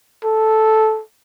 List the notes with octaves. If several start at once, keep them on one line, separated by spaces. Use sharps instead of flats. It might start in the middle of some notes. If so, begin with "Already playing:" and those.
A4